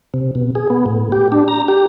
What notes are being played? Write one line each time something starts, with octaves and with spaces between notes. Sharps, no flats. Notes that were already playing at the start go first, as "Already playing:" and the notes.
C3
B2
G#4
B3
A2
G4
D4
A#5
G4